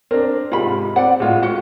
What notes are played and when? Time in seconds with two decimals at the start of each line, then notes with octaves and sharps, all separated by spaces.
0.11 C4 D4 A#4
0.51 G#2 C3 F4 B5
0.96 C4 D5 F#5
1.20 A2 G#3 F4
1.43 F#4 C#7